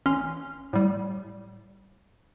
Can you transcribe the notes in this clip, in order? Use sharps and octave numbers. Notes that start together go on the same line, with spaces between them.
A1 C#4 C6 F6
A2 G3